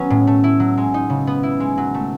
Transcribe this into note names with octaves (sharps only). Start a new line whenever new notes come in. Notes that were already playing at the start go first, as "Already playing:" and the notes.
Already playing: F#3 B3 C#4
A2
A3
E4
F#3
G#3
D#4
C#3
B3
E4
G#3
F#3
A3